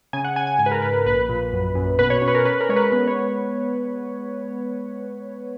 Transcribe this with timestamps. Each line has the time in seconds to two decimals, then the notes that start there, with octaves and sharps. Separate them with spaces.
0.13 C#3 G#5
0.24 F#5
0.36 C#3 G#5
0.47 G#5
0.59 G#2 G#5
0.66 B4
0.71 A#4
0.82 G#2 B4
0.94 B4
1.06 A#1 B4
1.29 A#2
1.53 F#2
1.75 F#2
1.99 B2 B4
2.10 C#5
2.22 C#4
2.28 B4
2.35 A#4
2.45 C#4 B4
2.61 A#4
2.69 G#3 C#5
2.76 B4
2.92 B3 B4
3.07 C#5